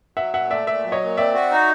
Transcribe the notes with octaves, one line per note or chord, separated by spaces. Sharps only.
F#3 E5 F#5
A#2 E5 F#5
A3 D5 E5
A#2 D5 E5
F#3
C#5 D#5
A#2
C4 D5 E5
F#4
D#4